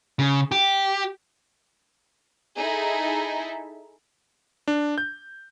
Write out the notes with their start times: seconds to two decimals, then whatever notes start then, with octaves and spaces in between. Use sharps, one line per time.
0.19 C#3
0.52 G4
2.57 D#4 E4 G#4 A4 E5
4.68 D4
4.98 G6